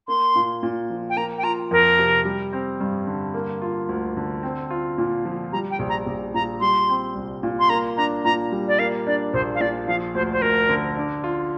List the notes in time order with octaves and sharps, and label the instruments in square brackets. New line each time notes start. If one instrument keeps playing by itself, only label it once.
[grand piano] A#3 [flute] C6
[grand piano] A#2
A#2
F3
[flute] G5
[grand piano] A#3 [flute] A#5
[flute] G5
[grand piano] F4 [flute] A#5
[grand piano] F2 [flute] A#4
[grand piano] C3
G3
C4
G2
D3
A#3
F4
D2
D3
C4
F4
A#2
F3
[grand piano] G3 [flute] A#5
[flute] G5
[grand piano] A#1
[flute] A#5
[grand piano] A#1
[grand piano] A#2 [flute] A#5
[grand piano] G3 [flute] C6
[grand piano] C4
C2
A#2
[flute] C6
[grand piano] A#3 [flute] A#5
[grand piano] D4 [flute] A#5
[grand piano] A#2 [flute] A#5
[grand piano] G3
[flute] D5
[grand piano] A#3 [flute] F5
[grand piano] D4 [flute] D5
[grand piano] A#1 [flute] C5
[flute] F5
[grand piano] A#2 [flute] D5
[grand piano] F3 [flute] F5
[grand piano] D2 [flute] C5
[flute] C5
[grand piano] D2 [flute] A#4
[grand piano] D3
D4
F4